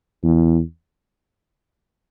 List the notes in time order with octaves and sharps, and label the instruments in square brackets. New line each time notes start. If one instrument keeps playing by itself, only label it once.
[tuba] E2